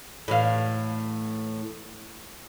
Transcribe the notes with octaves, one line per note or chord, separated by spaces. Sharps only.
A2 E3 F5